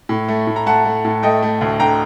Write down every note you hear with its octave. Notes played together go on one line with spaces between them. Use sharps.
A2
A3
A2
A#5
A3 F#5 A5
A3
A2
A3 D#5 G5
A3
D2
D3 G5 A#5